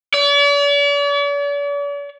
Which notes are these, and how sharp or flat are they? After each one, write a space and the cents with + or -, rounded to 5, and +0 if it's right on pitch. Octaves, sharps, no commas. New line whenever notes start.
D5 -45